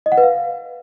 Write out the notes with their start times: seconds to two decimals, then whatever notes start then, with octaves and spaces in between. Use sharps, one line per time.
0.06 D#5
0.12 F#5
0.18 B4
0.23 F5